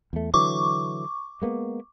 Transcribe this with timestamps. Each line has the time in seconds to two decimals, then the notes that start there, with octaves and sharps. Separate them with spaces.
0.13 E2 A3
0.34 D3 E3 F#3 C#6 D6
1.42 G#3 A#3 B3